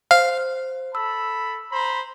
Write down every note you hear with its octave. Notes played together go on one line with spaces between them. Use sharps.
C5 F5
A4 A5 B5 E6
C5 A#5 B5